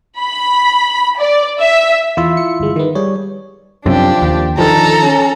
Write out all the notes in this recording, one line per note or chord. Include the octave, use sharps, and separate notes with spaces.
B5
D5
E5
E2 E4 F4 E5
C#7
G1 G#3
D#3 B3
G3 G#4 C#5
F#2 C3 F3 D4 G4
D#2
D3 D#3 F3 A4 A#5
C#4